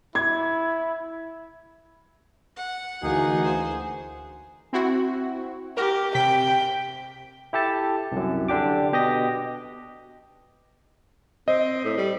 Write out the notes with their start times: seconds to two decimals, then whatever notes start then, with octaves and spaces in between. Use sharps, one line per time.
0.15 E4 G#6
2.57 F#5
3.02 D2 E3 A#3 D#4 F#4 G#4
3.45 C5
4.73 C4 E4 F#4
5.77 G4 A#4
6.15 C3 G5 B6
7.53 E4 G4 A4 A5
8.12 C2 F#2
8.48 D3 D4 G4 D6
8.92 B2 G4 D#5 A#6
11.48 C4 D#5
11.84 A2
11.97 G3